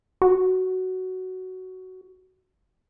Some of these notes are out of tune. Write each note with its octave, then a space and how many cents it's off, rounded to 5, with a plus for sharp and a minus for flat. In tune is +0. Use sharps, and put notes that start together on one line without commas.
F#4 +10